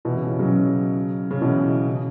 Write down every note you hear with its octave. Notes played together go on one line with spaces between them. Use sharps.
B2 E3
C#3
C#3
C#3 F#3
C#3
B2 E3
C#3